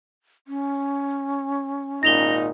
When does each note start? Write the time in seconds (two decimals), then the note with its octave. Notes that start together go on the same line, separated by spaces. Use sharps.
0.48 C#4
2.03 G#1 A#2 D#4 A#6 F7 G7